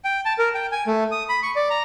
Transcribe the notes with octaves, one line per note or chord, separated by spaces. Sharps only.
G5
A5
A#4
G5
G#5
A3
D#6
B5
C#6
D5
A#5